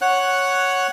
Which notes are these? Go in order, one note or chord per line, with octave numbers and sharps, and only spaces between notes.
C#5 F#5 F#6